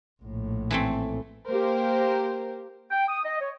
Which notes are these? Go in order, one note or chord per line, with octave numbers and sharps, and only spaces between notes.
A#1 A2
E3 A3 C4
A#3 G4 A#4 C5
G5
D#6
D#5
C#5